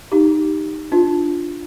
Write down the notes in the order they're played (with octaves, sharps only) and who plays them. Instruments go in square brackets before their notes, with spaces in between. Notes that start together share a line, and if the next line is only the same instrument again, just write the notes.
[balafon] D#4 G4
D4 F4